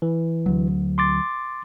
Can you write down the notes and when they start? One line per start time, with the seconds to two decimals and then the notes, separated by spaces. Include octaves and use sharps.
0.02 E3
0.46 D2 F#3
0.98 C6 D6 A6